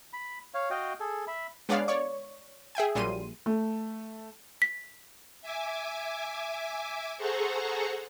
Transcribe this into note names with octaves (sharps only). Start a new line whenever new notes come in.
B5
C#5 F5
F#4 D#5 F5 G5
G#4 A4
E5 B5
G#3 B3 D4 C#5 D5 F5
C#5 D5 C#6
G#4 E5 G5 G#5
A#1 A#2 F#3 G3 C6 D#7
A3
B6
E5 G#5 D6
G#4 A4 C5 F#5 A#5 C#6